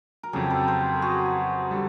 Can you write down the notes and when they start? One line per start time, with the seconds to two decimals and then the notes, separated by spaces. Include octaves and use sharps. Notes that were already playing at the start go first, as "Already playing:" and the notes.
0.23 A#4
0.33 F2 C#3 F#3 G4 A4
0.50 A4 B4
0.68 A#4 C5
1.02 F#4 G#4
1.71 D3 G3